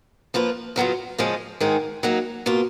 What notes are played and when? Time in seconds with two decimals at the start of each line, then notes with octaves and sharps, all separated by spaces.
0.34 F3 A#3 F4 B4
0.76 C#3 F#3 B3 F4
1.18 C#3 F3 G#3
1.60 G#2 D#3 G#3 D#4 G#4
2.03 F#3 A#3 D#4
2.46 B2 A#3 F4